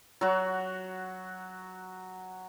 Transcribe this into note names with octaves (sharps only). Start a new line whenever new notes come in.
F#3 F#4